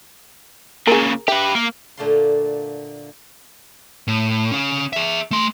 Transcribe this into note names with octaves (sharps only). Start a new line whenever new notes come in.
A#2 C#3 G#4 A#4
G4 B4 E5
A#3
A#2 D3 A3 D5 F5 C6
A2
C#4 F5
G#4 E5
A3 C6